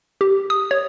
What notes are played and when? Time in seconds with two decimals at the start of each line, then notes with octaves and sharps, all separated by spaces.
0.21 G4
0.50 D#6
0.71 C#5